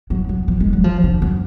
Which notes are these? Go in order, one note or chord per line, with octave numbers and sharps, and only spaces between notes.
F#3
F#3
F3
G#3
F#3
F3
D3
F#2